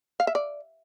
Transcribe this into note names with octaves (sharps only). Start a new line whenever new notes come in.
F5
E5
D5